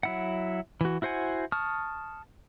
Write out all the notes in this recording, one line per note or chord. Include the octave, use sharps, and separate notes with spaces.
F#3 E4 F#5
E3 F#4
E4 F#4 C5 F#5 G#5
A5 C#6 D#6 F6